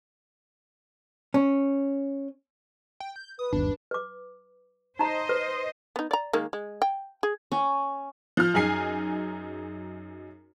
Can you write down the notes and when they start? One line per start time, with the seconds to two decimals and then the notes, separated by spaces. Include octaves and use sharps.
1.34 C#4
3.00 G5
3.16 G6
3.39 B4 D#6
3.53 G1 D#2 D4
3.91 B4 D6
4.99 D#4 C5 D#5 A#5
5.29 B4
5.96 B3 D#4
6.11 D5 A#5
6.33 D#3 G#3 A#3
6.53 G#3
6.82 G5
7.23 G#4
7.52 C#4
8.37 F3 F6
8.54 F#2 D#4 G#4 G#5 C7